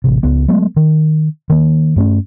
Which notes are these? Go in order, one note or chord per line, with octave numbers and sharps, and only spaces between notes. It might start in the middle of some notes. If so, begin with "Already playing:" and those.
A1 C3
C#2 B3
F#3 G#3 A3 B3
D#3
D#3 A#3
G2 A3 C#4